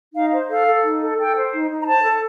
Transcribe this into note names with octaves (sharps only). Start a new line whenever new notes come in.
D#4 F5
C5
A4 F5
A4
D#4
A4
A4 G5
C5
D#4
D#4
A#5
C5 A5
A4